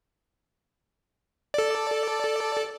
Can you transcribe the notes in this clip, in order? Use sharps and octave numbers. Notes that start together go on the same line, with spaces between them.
A4 D5